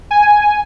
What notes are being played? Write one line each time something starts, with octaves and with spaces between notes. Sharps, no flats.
G#5